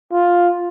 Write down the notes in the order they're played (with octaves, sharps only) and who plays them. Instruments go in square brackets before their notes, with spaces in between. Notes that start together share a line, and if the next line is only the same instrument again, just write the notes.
[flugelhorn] F4